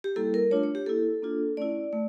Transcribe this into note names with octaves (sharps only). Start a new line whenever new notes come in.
G4
G3 A#3 E4 A4
A#4
A3 D4 F4 C#5
C#5
G4
A#3 E4 A4
A#3 D4 F4
A3 C#4 E4 D5
A3